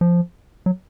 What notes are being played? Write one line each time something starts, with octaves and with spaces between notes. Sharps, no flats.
F3
F#3